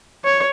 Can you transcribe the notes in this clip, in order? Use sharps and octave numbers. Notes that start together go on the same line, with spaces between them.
C#5